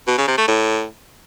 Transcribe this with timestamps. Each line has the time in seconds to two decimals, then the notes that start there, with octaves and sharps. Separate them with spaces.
0.08 B2
0.18 C#3
0.28 C3
0.38 A3
0.48 A2